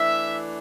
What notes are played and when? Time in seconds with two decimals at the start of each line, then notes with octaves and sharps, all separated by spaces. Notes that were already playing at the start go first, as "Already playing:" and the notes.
Already playing: E3 A3 D4 E5